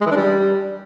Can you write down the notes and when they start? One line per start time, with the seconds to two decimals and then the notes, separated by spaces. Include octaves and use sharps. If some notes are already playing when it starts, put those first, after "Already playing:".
0.01 G#3
0.06 E3
0.11 D4
0.16 G3